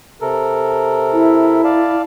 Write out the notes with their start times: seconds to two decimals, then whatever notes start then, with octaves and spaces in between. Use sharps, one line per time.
0.21 C3 A4 A#4
1.13 E4
1.64 D5 F5 A5